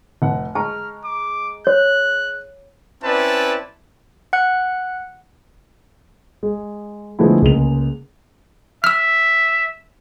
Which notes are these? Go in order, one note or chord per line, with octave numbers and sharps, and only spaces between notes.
F1 F#5
G#3 A5 A#5 C#6 F6
D6
C#5 F#6
C4 C#4 E4 B4 D5 A5
F#5 F#6
G#3
D3 F3 G#3 A3 B3 E4
C#2 G#3 A#3 F7
E5 E6 F6